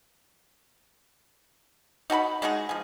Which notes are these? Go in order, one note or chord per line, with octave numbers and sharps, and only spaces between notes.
D#4 F#4 G#5 B5
G#3 D#4 F#4 G#4
F3 G#5